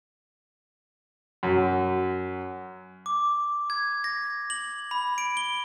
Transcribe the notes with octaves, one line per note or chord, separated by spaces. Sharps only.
F#2
D6
G#6
A#6
F#7
B5
D7
G7